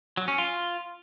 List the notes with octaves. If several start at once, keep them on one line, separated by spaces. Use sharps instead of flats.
F#3
C#4
F4